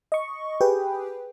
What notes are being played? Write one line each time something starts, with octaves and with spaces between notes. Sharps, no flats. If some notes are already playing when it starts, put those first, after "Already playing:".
D#5 C#6
G4 G#4 B4 G5